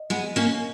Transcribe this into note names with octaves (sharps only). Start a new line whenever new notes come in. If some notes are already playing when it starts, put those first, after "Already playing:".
Already playing: D#5
G#3 B3
A#3 C#4